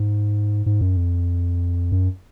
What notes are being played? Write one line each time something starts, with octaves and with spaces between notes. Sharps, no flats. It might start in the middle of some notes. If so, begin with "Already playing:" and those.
Already playing: G#2
G#2
F#2
F2
F#2